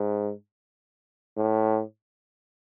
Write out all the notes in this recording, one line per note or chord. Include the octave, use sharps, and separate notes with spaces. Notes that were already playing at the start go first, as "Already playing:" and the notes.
Already playing: G#2
A2